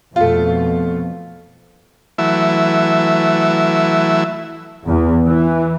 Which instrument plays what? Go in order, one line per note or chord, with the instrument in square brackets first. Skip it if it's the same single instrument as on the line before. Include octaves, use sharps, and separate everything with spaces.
[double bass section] F2 B2 [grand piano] A3 F4
[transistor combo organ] E3 F#3 A3 E4 B4 E5
[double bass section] E2
E3